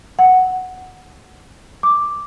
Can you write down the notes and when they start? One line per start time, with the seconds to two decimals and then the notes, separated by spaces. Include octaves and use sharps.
0.19 F#5
1.83 D6